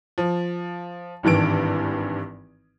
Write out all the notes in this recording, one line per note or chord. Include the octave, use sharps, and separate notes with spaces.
F3
G#1 G2 D#3 E3 D7